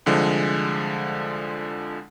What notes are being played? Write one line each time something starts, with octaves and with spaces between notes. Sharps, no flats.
C2 D3 F3 G#3